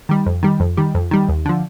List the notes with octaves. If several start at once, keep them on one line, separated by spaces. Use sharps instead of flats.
D#3 G3
F2
D#3 G3
F2
D#3 G3
F2
D#3 G3
D#2
D3 F3